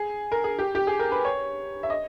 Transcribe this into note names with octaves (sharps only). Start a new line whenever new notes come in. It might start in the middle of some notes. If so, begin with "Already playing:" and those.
Already playing: G#4
A#4
G#4
G4
G4
G#4
A#4
B4
C#5
E5
D#5